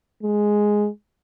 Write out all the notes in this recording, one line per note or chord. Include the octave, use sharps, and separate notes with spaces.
G#3